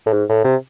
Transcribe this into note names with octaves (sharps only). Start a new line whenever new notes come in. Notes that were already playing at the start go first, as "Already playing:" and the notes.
A2
G#2
A2
C3